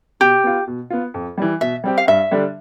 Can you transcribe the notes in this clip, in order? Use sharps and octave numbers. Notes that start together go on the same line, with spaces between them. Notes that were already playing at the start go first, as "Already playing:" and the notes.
B2 G4
B3 F4
B2
B3 F4
F2
E3 G3
B2 E5
G3 C4 G4
F5
G2 E5
D3 G3 D4